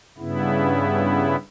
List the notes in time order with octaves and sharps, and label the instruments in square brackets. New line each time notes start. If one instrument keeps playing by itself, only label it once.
[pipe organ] G2 C#3 B3 E4